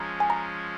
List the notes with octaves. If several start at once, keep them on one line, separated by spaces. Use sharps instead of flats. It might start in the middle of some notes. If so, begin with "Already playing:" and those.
Already playing: F3 G#3 C#4 A#5
G#5
A#5